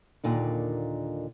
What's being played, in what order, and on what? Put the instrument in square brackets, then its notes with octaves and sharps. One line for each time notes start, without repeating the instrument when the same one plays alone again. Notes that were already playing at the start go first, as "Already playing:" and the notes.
[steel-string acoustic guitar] D#2 A#2 D3 D#4